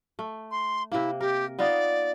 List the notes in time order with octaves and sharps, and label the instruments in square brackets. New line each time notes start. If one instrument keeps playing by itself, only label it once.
[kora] A3
[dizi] C6
[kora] C3 A#3 [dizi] E4
[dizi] G4 [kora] A#4
[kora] B3 D#4 F4 [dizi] D5